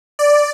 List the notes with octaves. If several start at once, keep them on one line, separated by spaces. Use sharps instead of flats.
D5